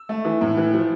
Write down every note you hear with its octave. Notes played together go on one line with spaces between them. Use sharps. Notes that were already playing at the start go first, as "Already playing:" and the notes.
Already playing: E6
A3
E3
A2
E3
F3